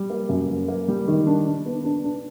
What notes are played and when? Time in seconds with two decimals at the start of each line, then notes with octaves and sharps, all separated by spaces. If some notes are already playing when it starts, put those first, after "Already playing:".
Already playing: G3
0.10 A#3
0.29 F#2
0.49 A#3
0.68 A#3
0.88 G3
1.08 D#3
1.27 D4
1.46 D4
1.66 B3
1.85 D4
2.04 D4